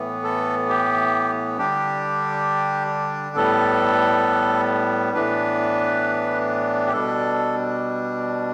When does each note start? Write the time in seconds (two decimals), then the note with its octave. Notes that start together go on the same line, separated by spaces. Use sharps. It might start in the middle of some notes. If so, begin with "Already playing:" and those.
Already playing: A2 E3 B3
0.24 A4
0.69 G4
1.58 D3 G3 D4 G4
3.36 A2 G3 B3 A4
5.14 A2 E3 B3 D4 B4
6.87 G4
6.93 B2 G3 D4 A4